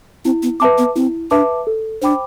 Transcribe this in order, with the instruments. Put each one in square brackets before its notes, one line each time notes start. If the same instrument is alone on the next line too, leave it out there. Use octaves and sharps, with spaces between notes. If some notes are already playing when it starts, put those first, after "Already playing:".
[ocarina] C4 [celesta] E4
[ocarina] B3
[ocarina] C4 [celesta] B4 E5 A5 D6
[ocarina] B3
[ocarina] C4 [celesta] E4
[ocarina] D4 [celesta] B4 E5 A5 D6
[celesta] A4
[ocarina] D4 [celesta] C5 G5 B5 D6